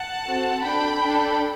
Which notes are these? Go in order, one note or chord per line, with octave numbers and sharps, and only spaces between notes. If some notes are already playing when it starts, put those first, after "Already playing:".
Already playing: F#5 A5
C4 F#4 A4
D4 A4 G5 B5
D4 A4